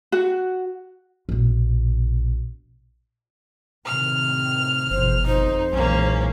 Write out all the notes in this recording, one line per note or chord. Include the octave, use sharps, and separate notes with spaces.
F#4
A#1 B2
A2 C3 D#3 F6
G1 E2 B2 C5
F2 D#4 C5
B1 A#2 E3 G#3 A#3 C#4